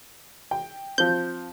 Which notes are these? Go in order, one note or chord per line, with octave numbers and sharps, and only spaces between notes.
G5
F3 C4 G6